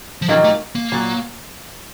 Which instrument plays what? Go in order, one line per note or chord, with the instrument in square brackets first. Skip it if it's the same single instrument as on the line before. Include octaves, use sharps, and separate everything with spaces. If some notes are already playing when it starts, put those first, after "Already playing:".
[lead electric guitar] F3
[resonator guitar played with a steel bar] A#2 F#3 A#3 D#4 G4 [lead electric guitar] E3
[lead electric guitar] A3
A#3
[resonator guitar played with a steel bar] A#2 F#3